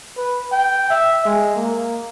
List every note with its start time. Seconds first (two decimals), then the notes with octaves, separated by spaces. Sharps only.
0.17 B4
0.52 G5
0.91 E5
1.25 G#3
1.56 A#3